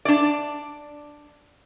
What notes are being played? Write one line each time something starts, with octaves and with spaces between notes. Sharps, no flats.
D4 D5